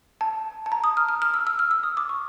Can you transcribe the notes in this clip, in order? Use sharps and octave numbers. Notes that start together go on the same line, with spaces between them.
A5
A5
A#5
D#6
F6
F6
F6
E6
E6
F6
E6
D#6
D6
C#6